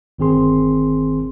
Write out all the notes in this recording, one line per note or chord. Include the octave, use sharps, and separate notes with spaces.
G1 D#3 C4 G#4 C6